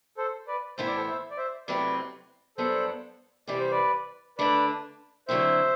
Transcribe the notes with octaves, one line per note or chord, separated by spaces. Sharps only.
A4 C5
B4 D5
A2 E3 B3 E4 C5
D5
A4 C5
C5 E5
D5
C5 E5
C3 F#3 A3 C4 E4 B4 D5
G2 F#3 B3 D4 A4 C5
C3 E3 G3 D5
C5
B4 D5
D3 A3 D4 B4 D5
D3 F#3 C4 E4 C5 E5